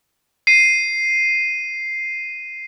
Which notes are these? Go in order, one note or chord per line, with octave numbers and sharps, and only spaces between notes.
C7 D#7